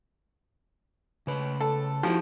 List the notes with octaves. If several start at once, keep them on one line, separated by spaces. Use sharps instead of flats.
C#3 B4
A4
F3 E4 F#4 G4